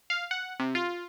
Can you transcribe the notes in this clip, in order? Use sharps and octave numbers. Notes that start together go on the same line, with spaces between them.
F5
F#5
C3
F4